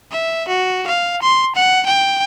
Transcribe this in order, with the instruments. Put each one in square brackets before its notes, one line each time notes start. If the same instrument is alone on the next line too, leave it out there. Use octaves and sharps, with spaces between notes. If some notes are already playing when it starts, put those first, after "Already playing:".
[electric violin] E5
F#4
F5
C6
F#5
G5